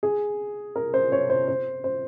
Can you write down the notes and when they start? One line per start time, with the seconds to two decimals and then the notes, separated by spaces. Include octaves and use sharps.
0.03 G#4
0.76 A#4
0.94 C5
1.12 C#5
1.30 C5
1.48 C5
1.84 C5